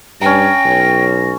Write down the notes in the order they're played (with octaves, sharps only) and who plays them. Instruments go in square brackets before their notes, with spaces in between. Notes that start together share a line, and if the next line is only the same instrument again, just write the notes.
[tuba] G2 [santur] C#4 A#5 [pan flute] G5 [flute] A#6
[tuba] B1